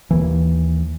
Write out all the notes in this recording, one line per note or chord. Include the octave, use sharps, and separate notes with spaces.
D#2 E3